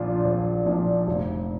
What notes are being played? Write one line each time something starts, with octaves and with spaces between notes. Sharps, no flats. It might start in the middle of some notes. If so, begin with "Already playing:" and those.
Already playing: A#1 A#2 F3 D4 F4
A#1
A#2 F3 D4 F4
F1